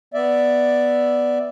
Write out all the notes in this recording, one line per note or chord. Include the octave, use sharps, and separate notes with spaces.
B3 D5 E5